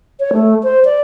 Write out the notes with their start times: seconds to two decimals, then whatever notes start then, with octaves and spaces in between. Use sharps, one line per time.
0.20 C#5
0.33 A3
0.63 C5
0.85 D5